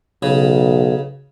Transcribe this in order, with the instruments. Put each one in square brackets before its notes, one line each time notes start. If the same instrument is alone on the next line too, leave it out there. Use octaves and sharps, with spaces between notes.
[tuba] B1 [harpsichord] C#3